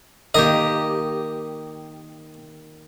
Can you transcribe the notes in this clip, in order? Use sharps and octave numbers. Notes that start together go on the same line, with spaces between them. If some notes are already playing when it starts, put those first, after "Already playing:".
D#3 A#3 G4 D#5